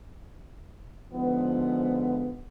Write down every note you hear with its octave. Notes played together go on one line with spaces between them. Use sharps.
G#2 D3 F3 B3